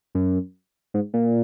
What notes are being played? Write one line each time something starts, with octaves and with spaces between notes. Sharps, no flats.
F#2
G#2
A#2